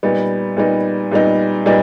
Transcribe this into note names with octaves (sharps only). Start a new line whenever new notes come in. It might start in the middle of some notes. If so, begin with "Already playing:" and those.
A#2 G3 B3 D#4
A#2 G3 B3 D#4
A#2 G3 B3 D#4
A#2 G3 B3 D#4